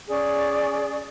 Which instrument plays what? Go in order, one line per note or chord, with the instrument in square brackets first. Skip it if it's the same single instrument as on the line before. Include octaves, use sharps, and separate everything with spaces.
[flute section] C#4 G#4 D5